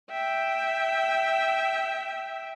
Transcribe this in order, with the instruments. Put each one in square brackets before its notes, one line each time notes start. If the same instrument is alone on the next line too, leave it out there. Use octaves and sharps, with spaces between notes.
[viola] E5 G5